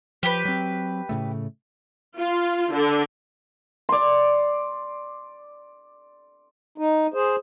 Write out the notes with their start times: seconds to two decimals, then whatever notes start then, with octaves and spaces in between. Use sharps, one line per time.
0.23 F3 G4 B4
0.45 F#3 C4
1.09 A2 C#3 A3
2.18 F4
2.73 D3
3.89 D5 C6
6.78 D#4
7.14 G#4 C5